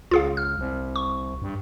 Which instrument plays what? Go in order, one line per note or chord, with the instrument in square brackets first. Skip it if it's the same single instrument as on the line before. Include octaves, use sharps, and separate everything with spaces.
[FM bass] C#2 [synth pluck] F4 G#4 F5
[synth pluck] F6
[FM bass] C2
[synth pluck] C#6
[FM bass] G2